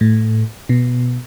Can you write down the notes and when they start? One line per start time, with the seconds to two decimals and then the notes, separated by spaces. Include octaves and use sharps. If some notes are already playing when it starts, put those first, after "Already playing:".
0.01 A2
0.69 B2